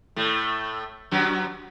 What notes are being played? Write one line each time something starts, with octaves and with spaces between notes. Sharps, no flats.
A2 A3
F#2 F#3